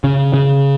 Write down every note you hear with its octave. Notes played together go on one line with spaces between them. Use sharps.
C#3
C#3